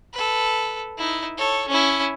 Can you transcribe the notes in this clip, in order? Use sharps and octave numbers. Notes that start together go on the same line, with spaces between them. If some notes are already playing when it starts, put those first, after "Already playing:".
A4 B4
D#4 E4
A4 C#5
C#4 E4